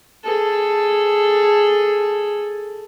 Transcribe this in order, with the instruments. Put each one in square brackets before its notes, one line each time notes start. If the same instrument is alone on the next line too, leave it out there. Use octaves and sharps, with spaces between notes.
[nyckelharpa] G#4 A4